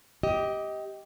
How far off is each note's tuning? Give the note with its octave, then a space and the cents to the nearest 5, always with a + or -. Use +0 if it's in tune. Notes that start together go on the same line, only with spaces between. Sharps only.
G4 +0 D#5 +20